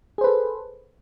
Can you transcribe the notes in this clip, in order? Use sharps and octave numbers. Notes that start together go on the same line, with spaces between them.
G#4 A4 B4 C5